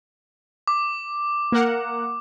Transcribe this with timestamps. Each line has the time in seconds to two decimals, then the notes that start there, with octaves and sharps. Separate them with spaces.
0.67 D6
1.52 A#3 A#4 F#5